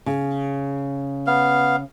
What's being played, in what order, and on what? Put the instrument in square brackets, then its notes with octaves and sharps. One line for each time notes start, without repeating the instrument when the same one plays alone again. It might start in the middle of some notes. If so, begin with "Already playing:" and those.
[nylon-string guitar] C#3
[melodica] B3 F5